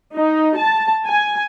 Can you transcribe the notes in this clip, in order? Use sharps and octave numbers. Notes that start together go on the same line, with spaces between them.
D#4
A5
G#5